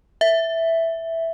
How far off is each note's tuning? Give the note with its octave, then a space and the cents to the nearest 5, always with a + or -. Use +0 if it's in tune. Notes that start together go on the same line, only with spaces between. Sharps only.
E5 +0